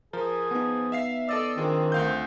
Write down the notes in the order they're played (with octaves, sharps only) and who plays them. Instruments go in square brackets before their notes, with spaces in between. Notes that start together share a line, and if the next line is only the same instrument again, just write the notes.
[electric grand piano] F3 [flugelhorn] G#4 [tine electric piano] A#4
[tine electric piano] B3 D#4
[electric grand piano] E5 F5 C7
[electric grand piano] A4 D#5 E6 [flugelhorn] D5
[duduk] D#3 [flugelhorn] C4 [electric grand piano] D4 G#4 [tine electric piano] F4
[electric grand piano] D2 F5 G6